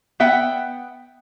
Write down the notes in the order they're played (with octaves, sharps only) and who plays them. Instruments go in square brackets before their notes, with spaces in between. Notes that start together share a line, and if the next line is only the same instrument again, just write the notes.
[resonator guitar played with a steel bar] B3 E5 F#5 G5